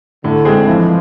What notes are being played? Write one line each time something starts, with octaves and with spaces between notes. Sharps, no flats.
A2 D3
G#3 C4 G#4
E3 F3